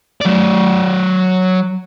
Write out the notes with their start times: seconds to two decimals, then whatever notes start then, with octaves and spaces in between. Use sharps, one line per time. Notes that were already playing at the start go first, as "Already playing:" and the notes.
0.21 F#3 D5